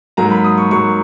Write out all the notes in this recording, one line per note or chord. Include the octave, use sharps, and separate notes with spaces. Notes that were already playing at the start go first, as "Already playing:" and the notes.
G#2 F#3 A#3 A#5
B5
D#6
C#6
G#2 F#3 A#3 C#6